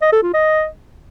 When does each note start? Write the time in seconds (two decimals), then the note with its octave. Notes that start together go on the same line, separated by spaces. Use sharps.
0.02 D#5
0.12 A4
0.23 F4
0.34 D#5